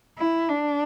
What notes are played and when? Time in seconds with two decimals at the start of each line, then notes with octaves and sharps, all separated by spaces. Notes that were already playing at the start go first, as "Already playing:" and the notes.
0.18 E4
0.49 D4